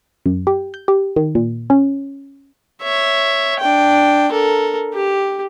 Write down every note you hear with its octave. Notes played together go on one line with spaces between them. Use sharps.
F#2
G4
G6
G4
D#3
A#2
C#4
C#5 E5
D4 G5
A4 A#4
G4